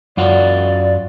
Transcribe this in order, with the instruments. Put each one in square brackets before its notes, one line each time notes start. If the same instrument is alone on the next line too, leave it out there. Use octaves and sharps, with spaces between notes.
[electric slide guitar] F#2 F4 F#4 [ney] D5